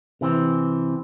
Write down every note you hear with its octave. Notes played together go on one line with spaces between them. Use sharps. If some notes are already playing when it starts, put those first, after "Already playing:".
C3 E3 C4